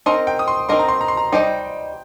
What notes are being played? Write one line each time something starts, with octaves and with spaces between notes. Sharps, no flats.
C4 D#4 A#4 D#5 C6
G5
D#6
C6
C4 D#4 A#4 D#5 C6
A#5
C6
A#5
C6
A#5
G3 D#4 C5 D#5 G5